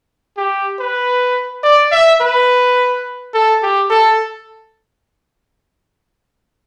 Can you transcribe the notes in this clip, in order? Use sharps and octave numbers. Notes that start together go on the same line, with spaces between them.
G4
B4
D5
E5
B4
A4
G4
A4